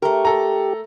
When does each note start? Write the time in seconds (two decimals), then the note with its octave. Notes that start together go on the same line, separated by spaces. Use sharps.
0.02 A3 G4 A#4
0.25 A4 A#5